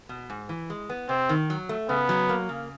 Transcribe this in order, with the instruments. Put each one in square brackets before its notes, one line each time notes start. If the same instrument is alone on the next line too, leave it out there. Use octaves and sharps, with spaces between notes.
[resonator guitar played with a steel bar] B2
G#2
E3
G#3
B3
[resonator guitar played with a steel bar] C3 [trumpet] C4
[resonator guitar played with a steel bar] D#3
F#3
A3
[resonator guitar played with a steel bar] C#3 [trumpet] B3
[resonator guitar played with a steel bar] F#3
A#3
C#3